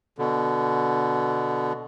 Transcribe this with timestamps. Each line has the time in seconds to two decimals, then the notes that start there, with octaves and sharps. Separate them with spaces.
0.18 B2 D3